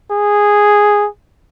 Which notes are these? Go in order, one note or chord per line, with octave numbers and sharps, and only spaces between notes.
G#4